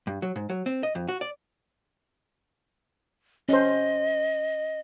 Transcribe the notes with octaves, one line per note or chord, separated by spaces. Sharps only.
G2
F#3
G#2
F#3
C4
D#5
F2
F#4
D5
C#4 C5 D#5